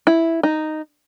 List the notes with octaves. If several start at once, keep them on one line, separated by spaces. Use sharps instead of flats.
E4
D#4